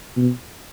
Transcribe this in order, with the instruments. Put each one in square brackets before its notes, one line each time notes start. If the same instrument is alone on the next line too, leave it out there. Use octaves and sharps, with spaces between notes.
[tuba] B2